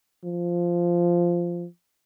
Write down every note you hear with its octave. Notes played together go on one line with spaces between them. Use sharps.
F3